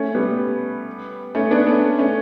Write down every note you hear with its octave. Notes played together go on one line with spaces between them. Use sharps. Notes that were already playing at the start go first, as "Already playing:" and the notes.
Already playing: A3 C#4
G3 B3
A3 C#4
B3 D4
A3 C#4
A3 C#4